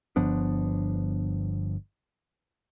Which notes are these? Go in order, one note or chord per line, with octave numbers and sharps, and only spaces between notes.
G1 F3 B3 D4